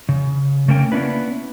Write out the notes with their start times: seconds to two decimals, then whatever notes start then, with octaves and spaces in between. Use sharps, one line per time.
0.09 C#3
0.68 C#3 A3 A#3 C#4 A#4 G5
0.92 A#3 B3 C#4 D4 E4 B4